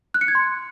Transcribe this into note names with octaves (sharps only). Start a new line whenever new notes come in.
F#6
C#7
G#6
C6